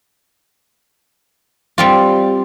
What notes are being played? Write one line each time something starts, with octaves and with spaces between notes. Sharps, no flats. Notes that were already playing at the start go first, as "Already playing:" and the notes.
G3 C4 F4